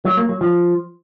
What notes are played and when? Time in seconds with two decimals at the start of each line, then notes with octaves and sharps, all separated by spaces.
0.05 F#3
0.17 A#3
0.29 F#3
0.41 F3